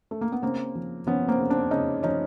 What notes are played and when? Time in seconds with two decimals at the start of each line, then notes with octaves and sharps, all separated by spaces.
0.11 A3
0.21 A#3
0.32 B3
0.42 C#3 A#3 C4
0.75 F3
1.07 F3 B3 C#4
1.28 A#3 C4
1.40 C#3
1.50 C4 D4
1.71 C#3 C#4 D#4
2.03 F3 C#4 D#4